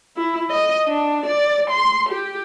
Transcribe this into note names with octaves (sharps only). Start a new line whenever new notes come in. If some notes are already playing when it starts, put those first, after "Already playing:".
E4
D#5
D4
D5
C6
G4